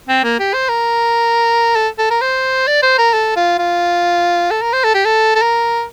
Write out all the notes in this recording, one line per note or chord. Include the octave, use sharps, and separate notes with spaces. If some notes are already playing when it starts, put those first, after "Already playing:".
C4
A#3
G4
C5
A#4
A4
A4
A#4
C5
D5
C5
A#4
A4
F4
F4
A4
A#4
C5
A4
G4
A4
A4
A#4